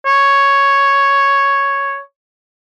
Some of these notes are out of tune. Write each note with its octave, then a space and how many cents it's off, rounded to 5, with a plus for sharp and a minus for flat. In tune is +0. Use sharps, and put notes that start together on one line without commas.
C#5 +0